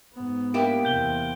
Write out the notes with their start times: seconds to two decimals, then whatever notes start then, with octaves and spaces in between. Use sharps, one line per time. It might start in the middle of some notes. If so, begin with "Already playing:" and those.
0.14 G#2 B3
0.54 A#3 E4 G4 D7
0.85 E2 C3 G6 G7